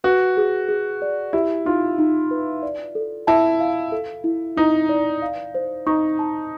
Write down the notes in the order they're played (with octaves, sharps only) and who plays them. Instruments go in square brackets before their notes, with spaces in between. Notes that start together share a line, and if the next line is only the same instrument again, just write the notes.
[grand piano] F#4 [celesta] B4
[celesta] G#4
G#4
D5
[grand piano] E4 [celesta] G4
[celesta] D#4 [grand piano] F4
[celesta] D#4
B4
D5
A4
[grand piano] E4 [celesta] A5
[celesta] F5
A4
E4
[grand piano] D#4 [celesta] E4
[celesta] D5
F5
C5
[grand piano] D#4 [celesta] C#6
[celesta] A5